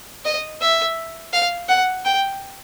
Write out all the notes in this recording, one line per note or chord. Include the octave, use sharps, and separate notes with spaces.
D#5
E5
F5
F#5
G5